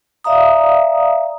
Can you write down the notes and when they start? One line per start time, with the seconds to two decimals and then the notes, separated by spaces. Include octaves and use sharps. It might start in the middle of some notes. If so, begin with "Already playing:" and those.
0.24 D5 E5 F5 A#5 D#6